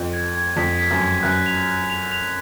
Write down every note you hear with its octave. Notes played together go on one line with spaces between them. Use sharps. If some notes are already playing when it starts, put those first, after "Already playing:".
Already playing: F2
G#6
G#6
F2 B6
B6
F#2
G#6
F#2 F#6
F7
F#6
F7
F7